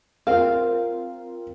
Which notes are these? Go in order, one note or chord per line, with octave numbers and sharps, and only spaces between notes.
C4 F4 A#4 F5